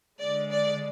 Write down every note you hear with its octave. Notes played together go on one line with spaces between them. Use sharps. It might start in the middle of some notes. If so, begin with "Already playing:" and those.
D3 G#3 D5
D5